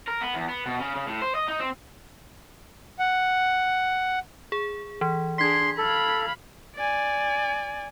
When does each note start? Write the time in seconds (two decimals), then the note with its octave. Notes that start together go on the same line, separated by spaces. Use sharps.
0.08 A#4
0.21 B3
0.34 E2
0.49 B3
0.66 B2
0.80 C#3
0.96 C#3
1.08 A2
1.22 C5
1.35 D#5
1.48 D#4
1.59 C4
2.99 F#5
4.52 G#4
5.01 E3
5.38 D4 G#4 C6 G#6 B6
5.78 A4 F5 B5
6.76 D5 G#5